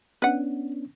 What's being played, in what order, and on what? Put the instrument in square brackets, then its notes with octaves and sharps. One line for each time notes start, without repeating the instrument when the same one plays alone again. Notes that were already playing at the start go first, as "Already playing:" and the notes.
[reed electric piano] B3 C#4 D4 [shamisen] B4 F#5